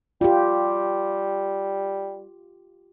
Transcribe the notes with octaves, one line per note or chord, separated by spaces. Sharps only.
G3 F4 G4